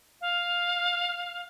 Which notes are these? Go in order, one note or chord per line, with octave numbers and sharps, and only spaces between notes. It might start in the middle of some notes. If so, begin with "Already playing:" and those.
F5